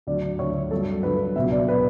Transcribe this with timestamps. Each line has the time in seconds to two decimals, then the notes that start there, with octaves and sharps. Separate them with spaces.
0.07 D2 D3 F#3 D5
0.39 D2 D3 F#3 C#5
0.71 G2 D3 F#3 A4
1.03 G2 D3 F#3 B4
1.35 C#2 B2 F#3 B3 E5
1.52 D5
1.68 B2 F#3 B3 B4